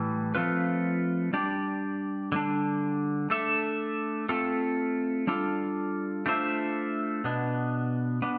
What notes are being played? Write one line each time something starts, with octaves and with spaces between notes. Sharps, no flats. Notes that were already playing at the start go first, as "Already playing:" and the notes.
Already playing: A2 E3 G3
F3 A3 C4 F4 B4
G3 D4 G4 D5
D3 G3 D4
A3 D4 A4 E5
A3 C4 F4 A4
G3 D4 F4 A4
A3 D4 F4 C5 E5
B2 B3 D4
B3 D4